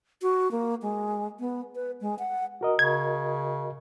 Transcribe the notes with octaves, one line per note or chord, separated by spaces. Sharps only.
F#4
A#3
G#3
B3
B4
G#3
F#5
F#4 A#4 D#5
C#3 G#6